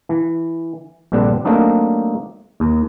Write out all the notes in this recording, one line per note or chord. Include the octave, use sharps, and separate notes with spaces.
E3
A#1 G2 D3 C4 D4 B4
F#3 A3 A#3 C4 D4 D#4
D#2